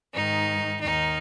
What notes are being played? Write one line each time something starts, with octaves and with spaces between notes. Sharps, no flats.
G#2 D#3 D#4
D#2 D#3 D#4